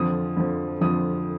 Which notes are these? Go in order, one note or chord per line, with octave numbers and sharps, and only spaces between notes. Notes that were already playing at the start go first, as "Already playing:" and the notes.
Already playing: F2 D3 F3 D#6
F2 D3 F3
F2 D3 F3 D#6